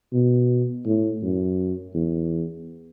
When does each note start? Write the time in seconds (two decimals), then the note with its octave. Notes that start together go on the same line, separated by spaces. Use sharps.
0.13 B2
0.86 A2
1.22 F#2
1.94 E2